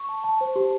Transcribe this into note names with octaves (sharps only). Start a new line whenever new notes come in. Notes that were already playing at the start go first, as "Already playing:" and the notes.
Already playing: C#6
A5
A5
C5
G4